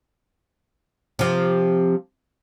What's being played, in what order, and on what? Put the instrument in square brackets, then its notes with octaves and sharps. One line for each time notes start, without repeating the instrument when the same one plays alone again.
[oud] C3 F3